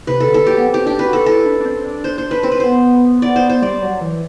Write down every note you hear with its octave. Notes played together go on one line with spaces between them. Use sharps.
C3 B4
A4
D3
A4
F#3 G4
B3
C4
G4
D4 G4
B4
F#4
A4
E4 A4
D4
D4
C4
D4
C5
C5
B4
C4 C5
B4
B3 C5
D5
C5
C5
G3 D5
F#3
E3